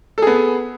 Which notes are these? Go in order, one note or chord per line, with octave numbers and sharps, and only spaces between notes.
B3 G#4 A4